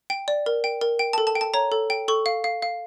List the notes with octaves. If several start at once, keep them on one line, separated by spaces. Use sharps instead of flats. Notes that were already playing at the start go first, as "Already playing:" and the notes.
G5
D5
A#4
G5
A#4
G5
A5
A4
A5
G5
A5
C#5 A#5
A4
G5
A4 C#6
F5
F5
F5